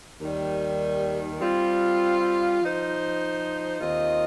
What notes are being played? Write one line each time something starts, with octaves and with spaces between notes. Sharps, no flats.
D#2 D#3 G3
G3 C4 F4
F3 D#4 C5
D#2 D#3 C4 F4 D#5